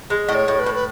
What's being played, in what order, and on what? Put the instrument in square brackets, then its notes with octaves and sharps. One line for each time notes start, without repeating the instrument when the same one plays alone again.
[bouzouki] G#3
[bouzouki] A2 [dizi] D#5
[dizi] C#5
[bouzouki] A2
[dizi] B4
[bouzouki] A2
[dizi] B4